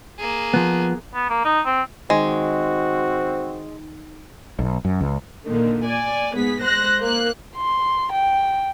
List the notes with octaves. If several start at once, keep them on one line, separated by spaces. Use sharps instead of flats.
A#3 G#4
F3 B3
B3
A#3
D#4
C4
D#3 G#3 C4 F#4
B1
F#2
C#2
A#2 D3 D#3
D5 G#5
G#2 B3 G#4 B6
G#3 C5 F#6 A#6
A#3 F#6
C6
G5